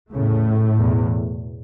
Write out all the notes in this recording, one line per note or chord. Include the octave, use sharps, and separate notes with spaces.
E2 A2 C#3 A3
E2 B2